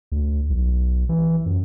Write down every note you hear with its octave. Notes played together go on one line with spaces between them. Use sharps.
D2
B1
E3
F#2